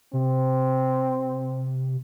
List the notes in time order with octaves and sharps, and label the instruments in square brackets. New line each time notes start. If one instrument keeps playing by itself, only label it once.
[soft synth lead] C3 [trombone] C4